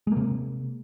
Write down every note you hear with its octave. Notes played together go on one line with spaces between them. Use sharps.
C3 G#3 A#3